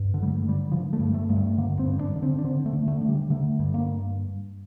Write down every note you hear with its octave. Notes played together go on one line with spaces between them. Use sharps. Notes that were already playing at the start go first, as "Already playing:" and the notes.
Already playing: G2
D3
G3
A3
D3
G3
D3 F3
A3
G2
A3
G2 A#3
A3
D3 A#3
C4
G2
D4
D3
C4
D4
D3 C4
A3
D3
A3
D3
G3
D3 A3
G2
A#3